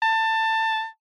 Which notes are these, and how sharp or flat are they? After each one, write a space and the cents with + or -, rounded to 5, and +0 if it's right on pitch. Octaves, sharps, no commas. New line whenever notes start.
A5 +20